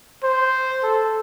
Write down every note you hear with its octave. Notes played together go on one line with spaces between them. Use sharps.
C5
A4